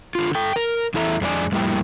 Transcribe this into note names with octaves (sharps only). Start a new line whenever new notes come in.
D3 F4
A4 G5
A#4
E2 E4 A4 E5 A#5
F2 G#3 D4 E4 D5 G#5
F2 A2 G3 A#3 E4 G5